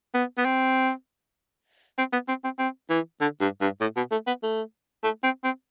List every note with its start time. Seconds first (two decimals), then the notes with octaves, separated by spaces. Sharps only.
0.14 B3
0.38 B3
0.45 C4
1.98 C4
2.13 B3
2.28 C4
2.44 C4
2.59 C4
2.90 E3
3.21 D3
3.41 G2
3.61 G2
3.81 A2
3.97 B2
4.11 A3
4.27 B3
4.43 A3
5.04 A3
5.23 C4
5.44 C4